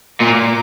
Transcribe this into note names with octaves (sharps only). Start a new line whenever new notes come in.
A#2 A#5 D6